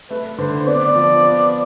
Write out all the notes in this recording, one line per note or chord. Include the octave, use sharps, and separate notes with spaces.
A3 B4
D3 C5
B3 D5
F3
B3